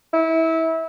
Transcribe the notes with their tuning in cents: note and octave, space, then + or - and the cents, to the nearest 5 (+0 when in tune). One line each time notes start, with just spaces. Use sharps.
E4 -25